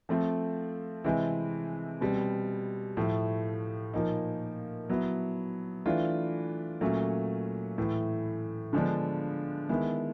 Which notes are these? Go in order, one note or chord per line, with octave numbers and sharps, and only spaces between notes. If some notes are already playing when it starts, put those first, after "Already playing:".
F3 A3 C4
C3 E3 G#3 C4 E4
B2 G3 C4
A2 F3 A3
A#2 F3 A#3 D#4
F#3 B3 E4
E3 A3 D4 F4
A#2 F#3 A3 C#4
A2 E3 A3
D3 F3 G#3 B3 D4
D#3 G#3 B3 E4